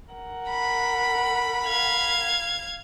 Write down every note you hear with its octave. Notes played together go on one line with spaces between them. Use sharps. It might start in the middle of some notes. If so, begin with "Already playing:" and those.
A#4 F#5
B5
F5 G#6